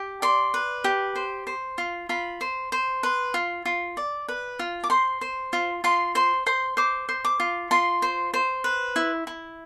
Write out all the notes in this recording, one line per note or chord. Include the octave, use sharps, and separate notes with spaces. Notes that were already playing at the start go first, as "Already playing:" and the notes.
Already playing: G4
D5 C6
B4
G4
C5
C5
F4
F4 B5
C5
C5
B4 C6
F4
F4
D5
B4
F4
D6
C5 C6
C5
F4
F4 C6
C5 C6
C5 C6
C5 D6
C5
D6
F4
F4 C6
C5
C5
B4
E4
E4